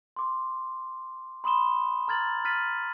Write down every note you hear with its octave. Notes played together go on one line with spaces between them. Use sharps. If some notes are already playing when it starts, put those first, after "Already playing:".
C6 D6
B5 C6 D#6 E7 G7
A#5 F6 G#6 A6 F#7
F6 A6 B6 D#7 F#7